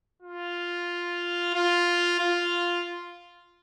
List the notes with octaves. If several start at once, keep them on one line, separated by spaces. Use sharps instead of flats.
F4
F4
F4